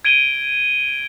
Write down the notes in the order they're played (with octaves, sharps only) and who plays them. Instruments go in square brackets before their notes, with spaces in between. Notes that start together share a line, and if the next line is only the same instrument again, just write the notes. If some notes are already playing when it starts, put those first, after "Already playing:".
[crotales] G#6 D7 D#7 G7